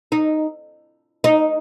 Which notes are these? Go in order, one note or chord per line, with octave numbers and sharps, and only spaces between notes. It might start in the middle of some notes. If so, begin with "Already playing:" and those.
D#4
D#4